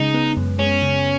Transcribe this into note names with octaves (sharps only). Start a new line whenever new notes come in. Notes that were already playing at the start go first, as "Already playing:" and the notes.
Already playing: C#3 G#3 D#4
B3
F#2
G#3 C#4
C#3